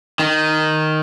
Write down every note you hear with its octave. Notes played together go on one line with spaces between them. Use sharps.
D#3